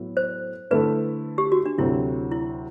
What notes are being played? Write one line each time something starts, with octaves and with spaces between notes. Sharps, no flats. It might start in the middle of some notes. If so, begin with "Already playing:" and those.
Already playing: A2 F#3 B3 E4
C5
D3 A3 E4 B4
G4
F#4
D4
D2 C3 F#3 C4 E4 F#4
E4